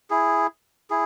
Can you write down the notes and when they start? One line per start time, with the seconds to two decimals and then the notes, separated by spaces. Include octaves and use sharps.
0.10 E4 G#4
0.90 E4 G#4